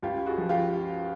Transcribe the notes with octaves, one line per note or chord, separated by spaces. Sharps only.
C#2 F4 G4
F#4 G#4
F3
F4 G4